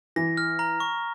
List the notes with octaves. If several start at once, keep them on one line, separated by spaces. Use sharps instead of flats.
E3 A#6
F6
A#5
C#6